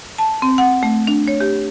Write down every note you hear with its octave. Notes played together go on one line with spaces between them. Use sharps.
A5
C4
F#5
A3
D4
C#5
G4